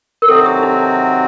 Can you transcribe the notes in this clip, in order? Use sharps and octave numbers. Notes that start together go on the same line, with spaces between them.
A#4
C3 D#3 F#3 C4 F#4 A4
G4
D#4